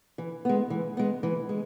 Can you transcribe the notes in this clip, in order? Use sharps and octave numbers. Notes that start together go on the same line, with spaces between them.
E3
G#3 B3
E3
G#3 B3
E3
G#3